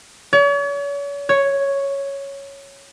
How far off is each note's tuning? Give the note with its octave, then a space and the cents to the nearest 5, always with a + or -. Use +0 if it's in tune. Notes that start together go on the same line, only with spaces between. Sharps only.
C#5 +40
C#5 +0